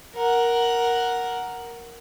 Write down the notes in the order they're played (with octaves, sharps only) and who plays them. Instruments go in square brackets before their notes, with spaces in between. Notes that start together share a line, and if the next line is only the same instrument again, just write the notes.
[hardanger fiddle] A#4 F#5